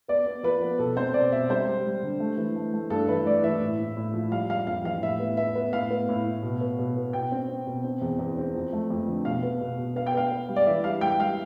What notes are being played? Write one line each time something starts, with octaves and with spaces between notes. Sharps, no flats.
B3 D5
B3
F3 B4
B3
B2 A4
C4 C5
B2 D5
B2 E5
G3 C5
G3
G3
D3
A3
E3
A3
A3
G2 A4
E3 B4
A3 D5
E3 E5
A2
A2
A2
F3
G3 F5
G3 F5
F2 F5
E3 F5
A2 E5
B3
B3 E5
B3
A2 F5
B3
A2
A2
B2
B3
B2
B3
B2 G5
C4
C4
B2
C4
E2
E2
C4
F2
A3
F2
D3
B2 F5
B3
B2
B2
B3 F5
G5
B3 F5
B3
G3
D5
E3 E5
G3 F5
G3 G5
G3 F5